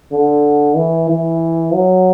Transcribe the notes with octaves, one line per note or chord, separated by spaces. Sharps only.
D3
E3
E3
F#3